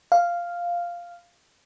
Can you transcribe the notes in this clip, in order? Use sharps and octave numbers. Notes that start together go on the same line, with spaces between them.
F5